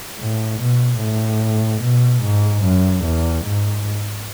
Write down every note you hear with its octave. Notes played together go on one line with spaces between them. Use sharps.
A2
B2
A2
B2
G#2
F#2
E2
G#2